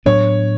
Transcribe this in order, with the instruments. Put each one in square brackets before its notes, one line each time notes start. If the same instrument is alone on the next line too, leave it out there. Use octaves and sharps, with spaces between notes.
[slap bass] A2 F#3 B3 D4 [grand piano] C#5